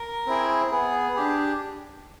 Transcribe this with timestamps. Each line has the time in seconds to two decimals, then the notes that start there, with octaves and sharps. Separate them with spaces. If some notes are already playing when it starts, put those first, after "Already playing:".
Already playing: A#4
0.26 C4 E4 G#4
0.72 B3 G#4
1.16 D4 G4